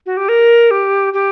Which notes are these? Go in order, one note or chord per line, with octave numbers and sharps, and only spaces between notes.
F#4
G4
A#4
G4
G4